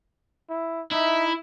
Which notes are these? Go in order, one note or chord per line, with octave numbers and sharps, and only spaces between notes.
E4
D#4 E4 E5